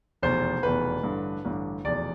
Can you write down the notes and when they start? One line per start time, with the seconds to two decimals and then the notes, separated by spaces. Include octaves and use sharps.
0.22 F1 E2 B2 C5
0.63 F1 E2 B2 B4
1.03 A1 G2 D3
1.45 A1 G2 D3
1.84 F1 E2 B2 D5